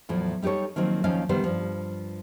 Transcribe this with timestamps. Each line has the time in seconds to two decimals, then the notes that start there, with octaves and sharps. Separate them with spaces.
0.09 E2 A2 F3 F#3
0.42 G3 D#4 G4 A4 C#5
0.76 D#3 F3 F#3 A#3 C4 D#4
1.04 D#2 F3 C4 C#4 D#4 F5
1.29 C3 D#3 G3 B3 C5
1.44 G2 F3